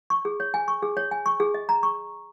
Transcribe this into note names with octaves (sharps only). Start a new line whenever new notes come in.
C#6
G#4
C#5
G#5
C#6
G#4
C#5
G#5
C#6
G#4
D#5
A#5
C#6